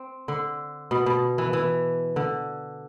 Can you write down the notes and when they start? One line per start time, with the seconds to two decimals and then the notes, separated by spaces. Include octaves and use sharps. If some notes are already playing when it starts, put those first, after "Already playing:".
Already playing: C4
0.28 D3
0.91 B2
1.06 B2
1.38 E3
1.53 E3
2.16 D3